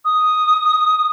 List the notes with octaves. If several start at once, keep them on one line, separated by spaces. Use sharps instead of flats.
D#6